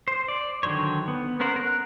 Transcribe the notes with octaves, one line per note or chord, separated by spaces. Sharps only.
C5
D5
D3 D#3 F#3 C5 C#5
B3
B3 C#4 A#4 C5 F#5
A#4 F#6